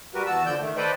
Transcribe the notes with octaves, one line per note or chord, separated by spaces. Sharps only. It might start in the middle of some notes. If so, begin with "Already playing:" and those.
G3 F#4 G4 A#4 B4
E2 F#4 A5 E6
D3 F3 D5 G5 E6 G6
D#3 A3
A4 B4 C5 D5 D#5 G5